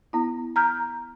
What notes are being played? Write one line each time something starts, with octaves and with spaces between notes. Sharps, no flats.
B3 E4
A#5 F6 G6